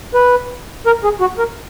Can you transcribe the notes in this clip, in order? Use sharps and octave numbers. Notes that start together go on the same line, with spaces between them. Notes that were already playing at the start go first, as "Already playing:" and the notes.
B4
A#4
G#4
F#4
A#4